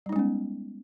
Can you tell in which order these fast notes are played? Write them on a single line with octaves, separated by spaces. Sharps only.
G3 D#4 G#3 C#4 B3